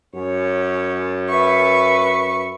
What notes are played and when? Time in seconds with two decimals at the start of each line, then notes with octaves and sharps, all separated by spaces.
0.15 F#2 C#5
1.30 B4 E5 C#6